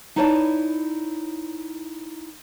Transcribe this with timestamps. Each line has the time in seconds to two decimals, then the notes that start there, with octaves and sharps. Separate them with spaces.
0.16 D#4 E4 B4 C#5 D5 A5